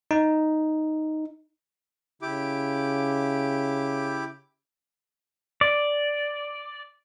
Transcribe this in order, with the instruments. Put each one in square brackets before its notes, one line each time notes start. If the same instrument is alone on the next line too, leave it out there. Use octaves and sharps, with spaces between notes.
[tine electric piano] D#4
[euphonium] C#3 [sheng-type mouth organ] E4 G4 D6
[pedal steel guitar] D5